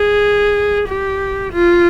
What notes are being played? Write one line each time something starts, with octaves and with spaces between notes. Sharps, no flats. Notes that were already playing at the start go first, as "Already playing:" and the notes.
Already playing: G#4
G4
F4